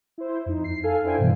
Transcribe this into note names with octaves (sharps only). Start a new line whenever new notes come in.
E4 C5
F2 D#4
C7
A4 F5 G#5
D4 E4 C5 G5 G#5
G2 B2 E3